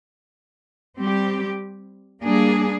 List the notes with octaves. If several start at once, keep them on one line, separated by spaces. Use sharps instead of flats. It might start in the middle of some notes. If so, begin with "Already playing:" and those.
G3 C4 G4
G3 A#3 D4 G#4